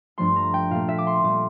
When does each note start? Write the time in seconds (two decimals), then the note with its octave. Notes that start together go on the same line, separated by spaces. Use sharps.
0.18 G2 F3 A3 C6
0.36 A#5
0.54 G5
0.71 A#2 A3 F5
0.89 E5
0.98 D6
1.07 C6
1.23 A#2 G3 A#3 D6